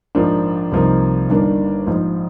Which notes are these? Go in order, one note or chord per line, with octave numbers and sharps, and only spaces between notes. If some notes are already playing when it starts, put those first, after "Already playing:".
A#1 G#2 F3 A#3 D4
C2 C3 F3 A#3 D#4
G1 G2 D#3 A#3 D4
A#1 G#2 F3